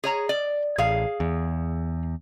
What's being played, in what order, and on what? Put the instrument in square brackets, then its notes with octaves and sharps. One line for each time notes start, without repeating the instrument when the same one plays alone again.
[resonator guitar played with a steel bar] G#4 C#5 A#5
D5
[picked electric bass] A1 [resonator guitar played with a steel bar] G#4 F5
[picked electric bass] E2